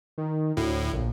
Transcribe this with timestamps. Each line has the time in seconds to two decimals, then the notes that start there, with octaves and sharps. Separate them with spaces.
0.18 D#3
0.57 D2 A2
0.93 A#1